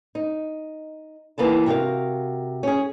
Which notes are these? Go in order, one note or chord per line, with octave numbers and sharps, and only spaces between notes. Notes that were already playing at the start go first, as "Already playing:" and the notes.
D#4
D#2 G#2 E3 A#3 B3 A5
C3 F#4 G#4 A#4 F5
C#4 G#4